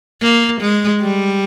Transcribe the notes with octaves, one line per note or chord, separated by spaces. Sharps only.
A#3
G#3
G3